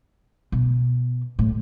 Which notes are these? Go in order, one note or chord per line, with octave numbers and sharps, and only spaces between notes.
B2
A2